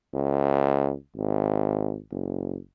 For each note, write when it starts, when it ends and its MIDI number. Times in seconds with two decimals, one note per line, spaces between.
0.14 0.93 37
1.17 1.98 32
2.11 2.58 30